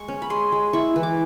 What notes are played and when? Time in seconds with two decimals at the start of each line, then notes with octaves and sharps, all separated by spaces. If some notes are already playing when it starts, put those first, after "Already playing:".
Already playing: G#3 C#6
0.08 C#4
0.22 B5
0.30 G#3 C6
0.52 G#3
0.73 E4 C#6
0.96 E3
1.03 D6